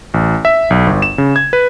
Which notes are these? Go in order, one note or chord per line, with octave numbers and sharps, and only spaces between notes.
A1
E5
B1
G1
E7
C#3
G#6
B4